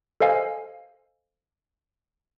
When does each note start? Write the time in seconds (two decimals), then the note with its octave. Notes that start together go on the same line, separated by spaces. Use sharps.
0.20 A4 C5 D#5 F5 G#5